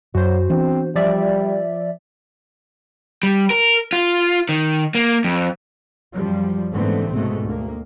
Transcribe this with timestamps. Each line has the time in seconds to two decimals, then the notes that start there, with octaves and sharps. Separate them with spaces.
0.15 F#2 F#3 F#4 C5
0.50 E3 B3 C4 D4
0.96 F3 G3 D5 E5
3.23 G3
3.50 A#4
3.93 F4
4.49 D#3
4.95 A#3
5.24 F2
6.13 F#2 F3 G3
6.72 G#2 D3 E3 A3 B3 C4
7.11 C2 G#2 B2 G#3 A3
7.44 D2 A#3